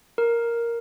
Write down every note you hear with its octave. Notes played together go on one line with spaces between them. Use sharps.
A#4